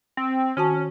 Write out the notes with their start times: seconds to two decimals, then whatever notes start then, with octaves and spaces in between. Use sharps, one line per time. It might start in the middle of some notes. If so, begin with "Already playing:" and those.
0.17 C4
0.57 D#3 C#4 F#4 A5